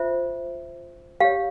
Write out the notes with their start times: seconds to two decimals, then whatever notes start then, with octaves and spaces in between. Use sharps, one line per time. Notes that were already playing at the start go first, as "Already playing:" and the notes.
Already playing: F4 C5 E5
1.20 G4 C#5 F5